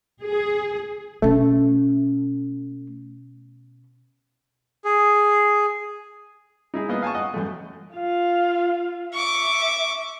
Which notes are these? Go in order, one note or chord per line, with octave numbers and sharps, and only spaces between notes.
G#4
B2 A3 C#4
G#4
D#4 E4 G#4
A#3 B3 D#5
F5 G#5 A5 C#6
D#5 F#5
F#2 A3
F4 F5
E5 C#6 D6